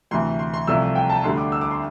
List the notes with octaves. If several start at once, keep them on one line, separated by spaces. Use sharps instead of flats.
D2 C3 E3 C6
C6
C6
C2 C3 F3 A3 E6
G5
A5
D2 D3 G3 C6
D6
E6
D6
C6